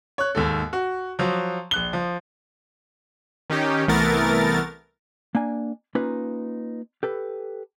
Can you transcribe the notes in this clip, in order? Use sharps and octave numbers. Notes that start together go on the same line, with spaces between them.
C#5 F#6
D#2 G#2 A4
F#4
F3 F#3
A#1 F#6 G7
F3
D#3 C#4 D#4 G4
C2 E3 A3 B3 A#4 A6
A#3 D4 G#5
A#3 C#4 D#4 F4 B4
G4 A4 B4